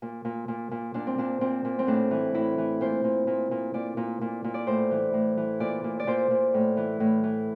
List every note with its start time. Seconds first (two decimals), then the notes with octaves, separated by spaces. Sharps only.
0.02 A#2
0.25 A#2
0.48 A#2
0.71 A#2
0.94 A#2 D4
1.07 C4
1.18 A#2 D4
1.41 A#2 C4
1.65 A#2
1.79 C4
1.87 A2 D4
2.11 E3
2.34 A2 E4
2.58 E3
2.81 A#2 C5
3.04 A#2
3.27 A#2
3.51 A#2
3.74 A#2 D5
3.97 A#2
4.21 A#2
4.44 A#2
4.54 D5
4.67 A2 C5
4.91 E3
5.14 A2
5.37 E3
5.60 A#2 D5
5.84 A#2
6.00 D5
6.07 A#2 C5
6.31 A#2
6.54 A2
6.77 E3
7.00 A2
7.23 E3